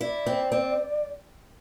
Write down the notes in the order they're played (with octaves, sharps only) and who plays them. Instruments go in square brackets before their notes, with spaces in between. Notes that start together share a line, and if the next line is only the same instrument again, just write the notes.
[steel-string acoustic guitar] E4 [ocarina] D5
[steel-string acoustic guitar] C4
C4